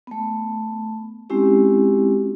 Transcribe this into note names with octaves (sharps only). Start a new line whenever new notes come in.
A3 B3
G#3 C4 C#4 E4 F#4 G4